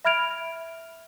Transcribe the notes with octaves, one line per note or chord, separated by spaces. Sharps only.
E5 B5 F6 G#6 D7 F7